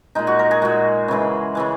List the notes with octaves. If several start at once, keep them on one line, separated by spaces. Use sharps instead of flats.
A#2 G#3 D#4
F#4
A#4
G#4
A#2 G#3 F#4
C#3 E3 G#3
C#3 E3 G#3